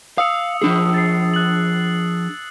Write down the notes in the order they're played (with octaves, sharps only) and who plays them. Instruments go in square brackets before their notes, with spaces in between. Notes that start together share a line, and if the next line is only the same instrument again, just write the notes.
[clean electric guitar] F5 [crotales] D#6 E6 C#7
[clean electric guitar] F3 D4 G#4
[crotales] A6 C7
F#6 F#7